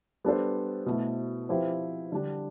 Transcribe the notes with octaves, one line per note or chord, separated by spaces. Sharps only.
G3 B3 D4 A4 C5
B2 A3 E4
F3 C4 E4 G4 B4
D3 G3 D4